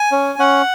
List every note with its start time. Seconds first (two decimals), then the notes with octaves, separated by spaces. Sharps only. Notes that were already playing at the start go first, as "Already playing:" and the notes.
Already playing: G#5
0.12 C#4
0.39 C#4 F#5